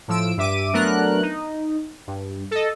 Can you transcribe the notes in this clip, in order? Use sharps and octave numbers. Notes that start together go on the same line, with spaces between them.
A2 F3 E6 D7
G2 E5 D6 D#7
F#3 A3 B3 D4 A#4 F#6
D#4
G2
A4 D#5